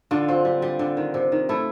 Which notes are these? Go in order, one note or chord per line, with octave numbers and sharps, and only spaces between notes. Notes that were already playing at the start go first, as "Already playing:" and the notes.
D3 F4
C4 F4
G3
G3
D3
D#3
C3
D#3
A3 E4